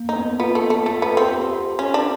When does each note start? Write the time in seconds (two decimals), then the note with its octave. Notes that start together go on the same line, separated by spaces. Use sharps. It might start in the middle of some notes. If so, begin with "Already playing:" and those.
Already playing: A#3
0.09 D#4
0.16 B3
0.40 B3 F4
0.55 A3
0.70 A3
0.86 A3
1.02 B3
1.17 C4
1.33 G4
1.79 C#4
1.94 D4